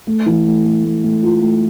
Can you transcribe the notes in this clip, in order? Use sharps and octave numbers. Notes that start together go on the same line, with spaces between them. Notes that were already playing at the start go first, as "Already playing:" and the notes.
A3
E3
A3
A3
A3
A3
F4
A3